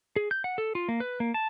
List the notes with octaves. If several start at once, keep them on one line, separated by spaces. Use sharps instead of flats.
G#4
G6
F#5
A4
F4
A#3
B4
A#3
A5